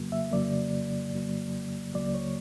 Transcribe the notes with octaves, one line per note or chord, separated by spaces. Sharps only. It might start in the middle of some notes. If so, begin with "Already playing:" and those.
Already playing: F2 C#3 F#3 A#3
E5
F2 C#3 F#3 A#3 D5
F2 C#3 F#3 A#3
C#2 C#3 F#3 A#3 D5
C#5